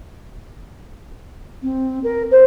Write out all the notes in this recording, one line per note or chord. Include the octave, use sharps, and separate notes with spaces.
C4
A#4
C5